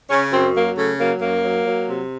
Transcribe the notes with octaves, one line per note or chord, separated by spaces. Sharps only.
C#3 C#4
F#2 C4
F#3 A#3
C#3 A3
F#3 A#3
F#2 A#3
F#3
F#3
C3